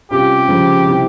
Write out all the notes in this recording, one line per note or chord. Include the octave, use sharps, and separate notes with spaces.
C3 G3 C#4 F4 G4
C#3 F3 G#3 C4
C3 G3 C4 E4